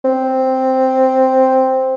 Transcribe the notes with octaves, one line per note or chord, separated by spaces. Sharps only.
C4